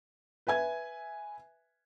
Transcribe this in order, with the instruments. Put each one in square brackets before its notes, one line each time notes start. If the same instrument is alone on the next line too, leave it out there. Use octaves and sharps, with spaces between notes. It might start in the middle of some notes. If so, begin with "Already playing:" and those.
[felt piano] B4 E5 G#5 G#6